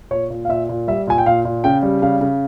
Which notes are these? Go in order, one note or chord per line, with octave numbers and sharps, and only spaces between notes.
A#2 C#5
A#2
F5
A#2 E5
A#2
G3 E5
A#2 G#5
G5
A#2 F5
A#2
C#3 G5
G3
C#3 F5
C#3